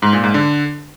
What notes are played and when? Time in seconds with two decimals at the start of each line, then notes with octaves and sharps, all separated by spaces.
0.02 G#2
0.13 A#2
0.24 G#2
0.34 D3